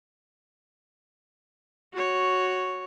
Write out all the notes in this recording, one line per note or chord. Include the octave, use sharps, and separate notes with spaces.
F#4 C#5